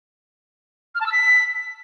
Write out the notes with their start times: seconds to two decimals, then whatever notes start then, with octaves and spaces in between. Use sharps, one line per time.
0.95 F6
1.01 A5
1.06 E6
1.12 B6